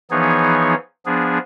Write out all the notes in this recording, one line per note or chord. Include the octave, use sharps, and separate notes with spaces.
E3 F3 B3 D#4 G#4 C#5
F3 B3 D4 G#4